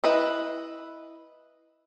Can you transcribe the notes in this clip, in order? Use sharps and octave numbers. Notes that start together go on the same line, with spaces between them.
E4 B4 D#5